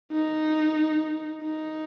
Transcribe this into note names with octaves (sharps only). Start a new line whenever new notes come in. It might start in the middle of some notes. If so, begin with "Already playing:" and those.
D#4
D#4